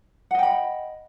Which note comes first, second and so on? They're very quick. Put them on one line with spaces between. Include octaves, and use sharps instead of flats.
F#5 D#5 G5 B5